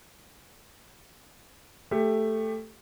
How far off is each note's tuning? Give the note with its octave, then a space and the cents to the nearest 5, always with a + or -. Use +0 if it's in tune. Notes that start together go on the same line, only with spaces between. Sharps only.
A3 +0 G4 +15